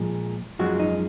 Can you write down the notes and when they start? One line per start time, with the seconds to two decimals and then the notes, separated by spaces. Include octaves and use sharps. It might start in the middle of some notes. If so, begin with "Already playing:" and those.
Already playing: A#2 F3 G#3
0.59 F#2 F3 G#3 F#4
0.80 D#4